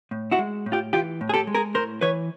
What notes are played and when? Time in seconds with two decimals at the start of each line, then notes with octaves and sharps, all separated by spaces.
0.11 A2
0.31 E4 F#4
0.39 G#3
0.66 A2
0.72 F4 G4
0.93 E3 F4 G4
1.21 A2
1.29 G#4
1.34 G4 A4
1.47 G#3
1.55 G#4 A#4
1.74 A2 A#4 C5
2.01 E3 B4 C#5